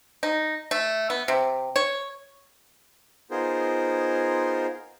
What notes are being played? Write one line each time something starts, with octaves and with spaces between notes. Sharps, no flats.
D#4
A3
B3
C3
C#5
B3 D#4 F4 G#4 A#4 C5